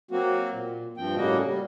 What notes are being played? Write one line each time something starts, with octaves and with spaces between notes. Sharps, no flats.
F#3 A#3 C4 F#4
A#2
G2 F3 C4 G5
A2 C#3 G3 A#3 F#4 D#5
G3